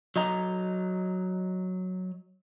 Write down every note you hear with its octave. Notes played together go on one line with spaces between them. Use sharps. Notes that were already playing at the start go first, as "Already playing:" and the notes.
F#3 D#5 A#5